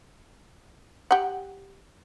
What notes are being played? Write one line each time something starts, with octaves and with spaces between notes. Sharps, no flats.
G4 F#5